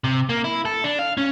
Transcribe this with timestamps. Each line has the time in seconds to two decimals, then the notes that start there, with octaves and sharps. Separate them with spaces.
0.04 C3
0.29 A#3
0.44 E4
0.65 A4
0.84 D4
0.99 F5
1.18 C#4